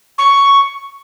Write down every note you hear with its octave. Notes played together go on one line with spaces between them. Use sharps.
C#6